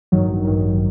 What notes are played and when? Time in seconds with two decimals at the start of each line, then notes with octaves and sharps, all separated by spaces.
0.12 A1 G2 D#3 F#3
0.45 A1 G2 D#3 F#3